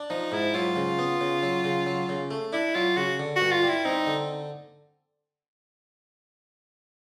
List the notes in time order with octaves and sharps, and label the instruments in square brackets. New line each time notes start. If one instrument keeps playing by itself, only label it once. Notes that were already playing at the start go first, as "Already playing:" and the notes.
Already playing: [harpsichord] D4
[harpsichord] F3 [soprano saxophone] D#4
[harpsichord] G#2 [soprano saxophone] E4
[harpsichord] F#3 [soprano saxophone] F4
[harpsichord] C#3
B3
C#3
F#3
C#3
F#3
C#3
A3
[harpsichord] D4 [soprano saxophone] E4
[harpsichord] F#3 [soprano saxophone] F4
[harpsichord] C#3 [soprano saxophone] F#4
[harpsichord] D3
[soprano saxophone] F#4
[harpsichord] G2
[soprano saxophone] F4
[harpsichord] G3
[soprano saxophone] E4
[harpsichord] C4 [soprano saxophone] D#4
[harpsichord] D3